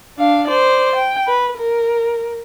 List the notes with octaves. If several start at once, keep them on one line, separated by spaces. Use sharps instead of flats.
D4 F5
C5 D5
G5
B4
A#4